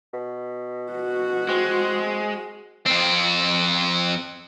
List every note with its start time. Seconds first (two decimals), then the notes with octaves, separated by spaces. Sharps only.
0.13 B2
0.92 F#4
1.49 G#3 C4
2.86 F2 C4